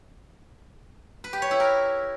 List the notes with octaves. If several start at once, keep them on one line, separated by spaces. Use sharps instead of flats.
B4
G4
C#5
E4
A#4